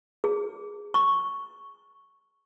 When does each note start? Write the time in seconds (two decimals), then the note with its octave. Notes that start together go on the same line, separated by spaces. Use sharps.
0.24 G#4
0.94 C#6